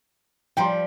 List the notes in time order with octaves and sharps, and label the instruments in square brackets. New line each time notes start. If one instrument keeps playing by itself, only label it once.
[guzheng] F3 G3 [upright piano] G5 A#5 C6